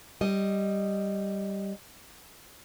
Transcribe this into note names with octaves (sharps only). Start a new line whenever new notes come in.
G3 D#5